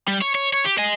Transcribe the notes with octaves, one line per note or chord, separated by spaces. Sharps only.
G3
C#5
C#5
C#5
G4
D#5 G#5